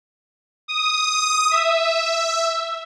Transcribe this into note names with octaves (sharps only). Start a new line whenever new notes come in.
D#6
E5